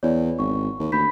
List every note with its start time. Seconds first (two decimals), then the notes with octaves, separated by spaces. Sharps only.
0.03 E2 C#5 D5
0.39 G#1 C#6
0.80 D#2
0.92 D2 B5 G6 B6